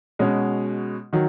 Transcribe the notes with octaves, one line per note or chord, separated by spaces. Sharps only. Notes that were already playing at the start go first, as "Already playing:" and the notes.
B2 G#3 C#4 F#4
D#3 F#3